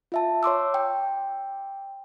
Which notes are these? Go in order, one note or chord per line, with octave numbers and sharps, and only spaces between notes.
F4 E5 A5
C#5 C6 D6 E6
G5